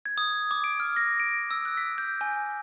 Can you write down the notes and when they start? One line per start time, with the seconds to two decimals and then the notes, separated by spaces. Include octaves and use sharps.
0.06 G#6
0.18 D#6
0.51 D6
0.64 D7
0.80 F6
0.97 A#6
1.20 D7
1.51 E6
1.65 F#6
1.77 B6
1.98 G6
2.21 G#5